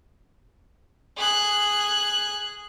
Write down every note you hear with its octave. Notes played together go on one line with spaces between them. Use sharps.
G#4 F#6